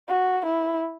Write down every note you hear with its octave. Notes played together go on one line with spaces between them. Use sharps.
F#4
E4